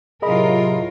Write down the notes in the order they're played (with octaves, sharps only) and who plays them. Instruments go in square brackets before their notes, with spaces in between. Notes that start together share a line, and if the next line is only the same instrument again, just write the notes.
[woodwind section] A2 C3 F#3 [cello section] F4 A#4 [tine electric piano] G#4 D#5 B5